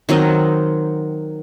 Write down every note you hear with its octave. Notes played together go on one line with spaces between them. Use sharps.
D#3 F#3 C4 D#5